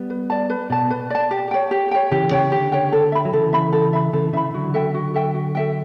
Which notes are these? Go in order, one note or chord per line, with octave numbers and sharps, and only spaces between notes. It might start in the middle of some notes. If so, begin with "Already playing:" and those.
Already playing: G3 B3
B4
D5 A5
B4
B2 D5 A5
B4
D5 A5
G4
C#5 G5
G4
C#5 G5
C#3 E3 G4
C#3 C#5 G5
D3 G4
C#5 G5
A4
E5 B5
F#3
C#3 E3 A4
E5 B5
A4
E5 B5
C#3 E3 A4
C#3 E3 E5 B5
D3 F#3 F#4
A4 E5 G5
F#4
A4 E5 G5
F#4
A4 E5 G5